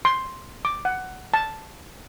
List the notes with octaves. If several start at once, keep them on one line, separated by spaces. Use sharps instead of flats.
C6
D6
F#5
A5